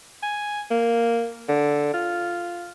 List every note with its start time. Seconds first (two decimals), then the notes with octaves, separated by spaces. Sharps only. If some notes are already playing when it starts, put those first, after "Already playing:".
0.23 G#5
0.71 A#3
1.49 D3
1.94 F4